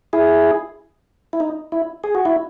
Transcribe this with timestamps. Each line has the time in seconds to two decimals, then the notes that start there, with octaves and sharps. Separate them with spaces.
0.13 E4 G#4
1.33 E4
1.40 D#4
1.72 E4
2.04 G#4
2.15 F#4
2.25 E4